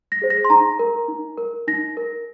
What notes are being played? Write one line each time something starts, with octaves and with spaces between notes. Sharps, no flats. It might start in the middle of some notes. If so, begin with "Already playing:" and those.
A#6
G#4 C5
A#6
C6
D#4 A#5
A#4
D#4
A#4
D#4 A#6
A#4